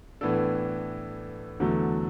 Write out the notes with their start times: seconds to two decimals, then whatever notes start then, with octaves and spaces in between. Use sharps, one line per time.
0.21 A2 E3 B3 D4 A4
1.60 E2 D3 F#3 A3